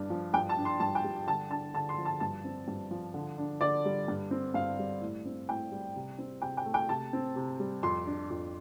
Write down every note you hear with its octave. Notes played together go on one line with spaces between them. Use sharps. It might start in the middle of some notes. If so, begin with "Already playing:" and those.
Already playing: G2 D4
F3
G2 G5
A5
D4
C6
G2 A5
G5
G3
D3 A5
D4 A5
D3 A5
C6
F3
A5
G2 A5
C4
G2
F3
D3
D4
D3 D5
G3
G2
C4
G2 F5
G3
A2
C4
A2 G5
G3
C3
C4
C3 G5
G5
A3
G5
C3 A5
C4
C3
G3
F2 C6
D4
F2